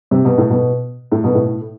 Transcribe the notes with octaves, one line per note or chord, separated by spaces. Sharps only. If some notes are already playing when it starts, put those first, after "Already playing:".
C3
B2
A2
B2
A2
B2
A2